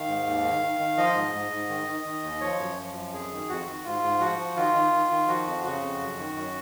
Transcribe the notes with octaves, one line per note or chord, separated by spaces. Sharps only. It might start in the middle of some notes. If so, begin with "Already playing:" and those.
Already playing: D#3 F5
G#2
D#2
D#3
D#3
D#3
F3 D#5
G#2
G#2
G#2
D#3
D#3
D#3
D#2
F3 C#5
F#2
F3
F#2
F2 G#4
D#3
F2 F#4
D#3
G#2 F4
G#2
F3 F#4
F3
D#3 F4
D#3
D#3
D#3
F3 F#4
F2
C#3 F#4
F2
F#2
D#3
F#2